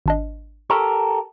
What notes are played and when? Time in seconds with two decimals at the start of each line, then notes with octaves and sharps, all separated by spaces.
0.06 G#1 D4 D#5
0.70 G4 A4 A#4 C#6